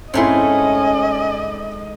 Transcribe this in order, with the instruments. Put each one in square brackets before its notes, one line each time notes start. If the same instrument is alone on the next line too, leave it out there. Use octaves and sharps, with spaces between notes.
[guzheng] G#2 A3 C6 [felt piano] C4 E4 [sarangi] C#4 [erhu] D#5